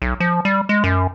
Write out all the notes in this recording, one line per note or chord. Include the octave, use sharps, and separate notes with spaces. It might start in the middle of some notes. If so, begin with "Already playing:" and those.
B1
F3
G3
G#3
F#2